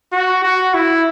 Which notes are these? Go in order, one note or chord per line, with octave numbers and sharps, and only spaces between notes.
F#4
F#4
E4